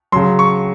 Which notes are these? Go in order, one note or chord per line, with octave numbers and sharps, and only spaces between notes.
C#3 F#3 C6
C#6